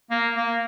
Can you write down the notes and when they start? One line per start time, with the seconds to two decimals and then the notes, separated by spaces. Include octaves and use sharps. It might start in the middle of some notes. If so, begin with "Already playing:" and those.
0.11 A#3
0.36 A#3